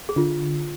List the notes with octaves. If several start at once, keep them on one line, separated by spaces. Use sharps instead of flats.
G#4
D3 F4